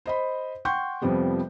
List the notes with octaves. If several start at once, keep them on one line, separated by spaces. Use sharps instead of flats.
C5 D#5 B5
F#5 G5 C6 C#6 G6
F2 C3 F3 G3 B3